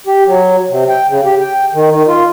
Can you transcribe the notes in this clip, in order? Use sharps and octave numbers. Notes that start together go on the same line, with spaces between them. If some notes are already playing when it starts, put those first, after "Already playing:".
G4
F#3
C3
G5
C#3
G4
G5
D#3
D#3
F4